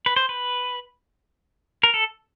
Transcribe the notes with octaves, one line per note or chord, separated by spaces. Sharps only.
B4
C5
B4
A#4
A4